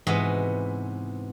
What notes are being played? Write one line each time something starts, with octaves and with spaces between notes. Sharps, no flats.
G#2 C3 E3 B3 F#4 D#5